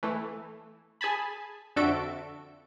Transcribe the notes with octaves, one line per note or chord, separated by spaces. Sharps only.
E3 A3
G#4 G#5 A5 B5
F2 D3 F#4 A4 E5 D7